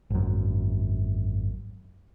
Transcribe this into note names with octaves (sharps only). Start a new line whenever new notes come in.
G#1 F#2